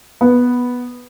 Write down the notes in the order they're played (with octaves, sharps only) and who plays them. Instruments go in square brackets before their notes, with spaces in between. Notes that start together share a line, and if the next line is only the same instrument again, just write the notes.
[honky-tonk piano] B3